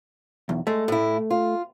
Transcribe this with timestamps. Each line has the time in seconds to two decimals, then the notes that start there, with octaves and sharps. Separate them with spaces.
0.49 B1 E2
0.67 G#3 A3
0.88 A2 E4
1.30 F4